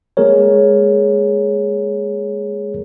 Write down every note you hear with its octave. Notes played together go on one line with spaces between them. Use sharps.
G#3 A#3 G#4 A#4 C#5